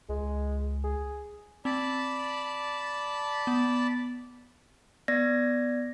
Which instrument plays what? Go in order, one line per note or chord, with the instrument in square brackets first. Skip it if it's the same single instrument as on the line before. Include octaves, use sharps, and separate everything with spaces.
[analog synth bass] C#2 [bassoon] G#3
[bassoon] G#4
[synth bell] C4 [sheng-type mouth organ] D5 A5 B5
[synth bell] B3
[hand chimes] B3 D5 G#6 A#6